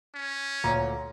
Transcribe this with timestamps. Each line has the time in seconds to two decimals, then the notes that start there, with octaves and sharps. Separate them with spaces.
0.14 C#4
0.64 D2 A#2 C#5 A#5